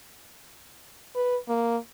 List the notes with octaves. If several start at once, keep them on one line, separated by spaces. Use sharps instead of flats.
B4
A#3